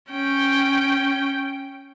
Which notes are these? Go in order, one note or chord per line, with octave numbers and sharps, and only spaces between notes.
C#4 G5